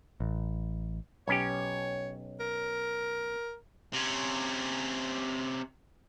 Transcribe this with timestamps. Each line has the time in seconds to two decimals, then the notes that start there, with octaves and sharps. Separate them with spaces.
0.20 A1
1.28 B1 C#4 G4 C#5
2.40 A#4
3.93 C3 C#4